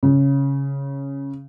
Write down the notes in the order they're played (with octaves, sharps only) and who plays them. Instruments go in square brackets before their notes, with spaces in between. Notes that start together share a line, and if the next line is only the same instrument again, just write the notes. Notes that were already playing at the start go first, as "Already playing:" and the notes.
[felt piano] C#3